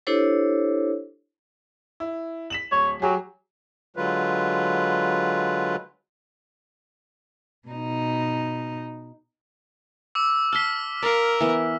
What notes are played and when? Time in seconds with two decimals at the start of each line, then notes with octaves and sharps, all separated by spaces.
0.07 D4 E4 G4 A4 C5 C#5
2.00 E4
2.50 B6 E7 F#7
2.72 D1 C#5
3.02 F#3 G4 G#4
3.97 D3 F#3 G#3 F4 B4
7.68 B2 D#4
10.15 D6 E6
10.53 A5 C6 F6 B6
11.02 A#4 D5 F5
11.40 E3 B3